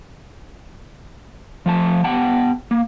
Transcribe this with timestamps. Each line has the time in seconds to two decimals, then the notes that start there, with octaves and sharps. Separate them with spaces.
1.66 F3 A3 A5
2.04 B3 G4 F#5 G5 A5
2.71 A#3